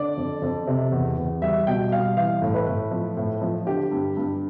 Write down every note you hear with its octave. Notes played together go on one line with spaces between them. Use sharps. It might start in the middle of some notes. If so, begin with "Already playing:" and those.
Already playing: D3 D5
F2
F2
C3
E2
E2
G3 E5
B2 G5
G3 F5
E3 F5
A2
B4
A2
F3
A2
F3
D3 G4
G2
G2